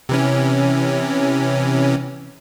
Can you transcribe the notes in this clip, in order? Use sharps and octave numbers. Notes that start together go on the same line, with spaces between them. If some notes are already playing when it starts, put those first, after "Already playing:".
C3 E3 C#4